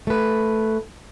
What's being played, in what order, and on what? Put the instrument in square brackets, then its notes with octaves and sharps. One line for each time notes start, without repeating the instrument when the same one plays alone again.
[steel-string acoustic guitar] A3 B4